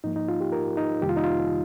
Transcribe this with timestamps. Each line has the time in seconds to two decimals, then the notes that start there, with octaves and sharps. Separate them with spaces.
0.04 G#2 F3 A#3 D#4
0.16 D#4
0.28 F4
0.41 G4
0.52 A#4
0.77 D#4
1.02 F2 C3 D#3 G3 A#3 G4
1.09 F4
1.17 D#4
1.24 F4